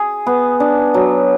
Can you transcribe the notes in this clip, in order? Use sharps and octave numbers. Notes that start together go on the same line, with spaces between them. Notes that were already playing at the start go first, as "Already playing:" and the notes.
Already playing: G#4
B3
D4
F#3